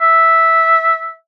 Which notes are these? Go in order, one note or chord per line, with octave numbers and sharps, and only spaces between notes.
E5